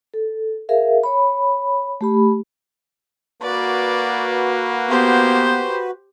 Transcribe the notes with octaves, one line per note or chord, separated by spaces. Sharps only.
A4
G#4 A#4 E5 F5
C#5 B5
A3 G4 B5
A#3 F#4 B4 D5
B3 G4 C5